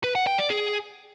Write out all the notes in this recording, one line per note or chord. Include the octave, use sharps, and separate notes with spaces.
B4
F#5
G5
D5
G#4